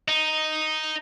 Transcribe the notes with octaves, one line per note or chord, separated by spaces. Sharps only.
D#4